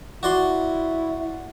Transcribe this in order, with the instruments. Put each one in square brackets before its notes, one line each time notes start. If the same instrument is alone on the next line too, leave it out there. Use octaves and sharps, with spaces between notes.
[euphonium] E4 [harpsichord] F#4 D5 C6